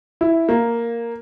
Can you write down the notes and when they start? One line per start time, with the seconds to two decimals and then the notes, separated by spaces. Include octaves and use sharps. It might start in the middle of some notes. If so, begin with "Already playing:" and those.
0.21 E4
0.49 A#3